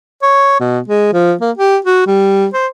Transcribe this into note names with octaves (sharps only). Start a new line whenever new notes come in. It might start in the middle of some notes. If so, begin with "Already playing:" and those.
C#5
B2
G#3
F3
A#3
G4
F#4
G3
C5